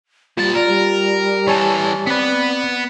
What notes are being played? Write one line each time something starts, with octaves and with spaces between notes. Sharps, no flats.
A#2 G3 F4 A5
A#4 D5
G3
E3 A4 C#5 G#5 A5
B3 C4 B4 D5